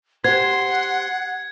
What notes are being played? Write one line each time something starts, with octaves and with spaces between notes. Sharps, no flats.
G4 C5 F#5 C6 G#6